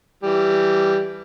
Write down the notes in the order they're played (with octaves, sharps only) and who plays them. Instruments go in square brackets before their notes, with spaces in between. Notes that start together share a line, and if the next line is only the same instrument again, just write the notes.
[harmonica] E3 G3